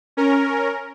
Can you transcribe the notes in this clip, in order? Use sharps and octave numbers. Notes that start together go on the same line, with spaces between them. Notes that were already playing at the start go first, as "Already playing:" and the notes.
C#4 A#4